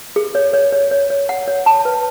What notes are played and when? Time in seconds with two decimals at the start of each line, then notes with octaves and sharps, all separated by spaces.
0.16 G#4
0.35 C#5
0.54 C#5
0.72 C#5
0.91 C#5
1.10 C#5
1.29 F#5
1.48 C#5
1.66 A5
1.85 B4